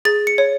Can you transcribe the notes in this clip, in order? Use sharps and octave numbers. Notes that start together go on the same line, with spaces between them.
G#4 A6
C#7
C#5